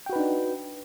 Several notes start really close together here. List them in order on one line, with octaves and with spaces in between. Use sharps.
G5 F#4 B4 D#4 D4